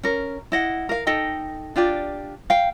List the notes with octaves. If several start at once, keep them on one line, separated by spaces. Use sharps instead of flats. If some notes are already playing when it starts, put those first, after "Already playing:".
C#4 A#4
E4 D#5 F#5
A#4 F5
D#4 A4 D#5 G5
D4 F4 G4 D5
F5 G5